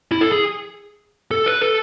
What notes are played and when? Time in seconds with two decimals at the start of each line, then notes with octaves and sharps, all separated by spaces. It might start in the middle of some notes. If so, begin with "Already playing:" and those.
0.12 E4
0.21 A4
0.32 G#4
1.31 A4
1.46 B4
1.61 A4